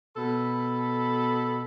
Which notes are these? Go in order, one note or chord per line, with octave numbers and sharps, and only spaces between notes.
B2 A4 B5